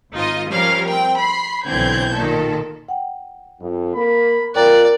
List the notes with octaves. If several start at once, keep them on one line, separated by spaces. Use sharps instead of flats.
G#1 D#4 F4 D#5
F3 G3 C#4 A#4 F5
C4 G5
B5 C6 C7
B1 D3 E3 C4 G6 G#6
A#2 D#3 A4
F#5 G5
F2
A#3 A#4 B5
F2 F4 A#4 D5 G5 A#5 F#6